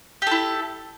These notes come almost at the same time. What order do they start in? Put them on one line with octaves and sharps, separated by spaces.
G4 A4 E4